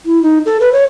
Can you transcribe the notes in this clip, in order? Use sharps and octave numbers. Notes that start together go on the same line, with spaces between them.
E4
D#4
A4
B4
C#5